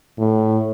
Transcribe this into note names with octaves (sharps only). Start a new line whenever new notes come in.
A2